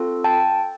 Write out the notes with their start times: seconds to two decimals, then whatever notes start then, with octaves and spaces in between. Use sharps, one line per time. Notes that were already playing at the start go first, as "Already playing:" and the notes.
Already playing: C4 F4 A4
0.24 G5 A5